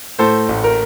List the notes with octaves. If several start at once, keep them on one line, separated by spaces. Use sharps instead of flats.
A2 A4 C5
A1
A#4